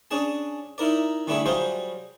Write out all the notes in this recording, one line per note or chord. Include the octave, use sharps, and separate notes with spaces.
C#4 D4 G#4 A5
D#4 E4 A#4 D5
D3 G3 A3 D4 E4 G#4
F#3 G3 F4 G#4 C5